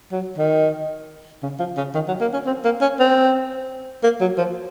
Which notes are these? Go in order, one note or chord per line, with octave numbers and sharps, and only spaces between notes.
F#3
D#3
C#3
F3
C#3
D#3
F#3
A#3
C#4
C4
A#3
C#4
C4
A#3
F#3
F3